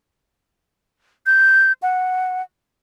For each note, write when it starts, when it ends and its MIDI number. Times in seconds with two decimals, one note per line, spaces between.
1.26 1.72 91
1.82 2.42 78